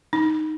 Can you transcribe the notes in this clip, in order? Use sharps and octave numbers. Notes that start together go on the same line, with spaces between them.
D#4